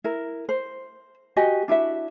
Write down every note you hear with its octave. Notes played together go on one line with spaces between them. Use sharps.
E4 A#4
C5
F#4 G4 D#5 G#5
D4 E4 F#4 E5